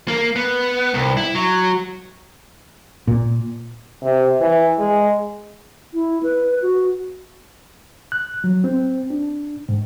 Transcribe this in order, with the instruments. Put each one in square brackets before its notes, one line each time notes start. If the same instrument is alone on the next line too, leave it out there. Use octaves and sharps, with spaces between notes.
[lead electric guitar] A#3
B3
C2
E4
F#3
[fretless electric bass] A#2
[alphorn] C3
E3
G#3
[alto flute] E4
B4
F#4
[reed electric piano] F#6
F#3
C4
D4
G#2